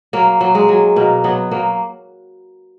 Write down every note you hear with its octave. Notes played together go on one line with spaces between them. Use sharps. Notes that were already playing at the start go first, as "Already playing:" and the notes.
F#3 A#3
F#3
G#3
F#3
B2 A#3
F#3 B3
F#3 A#3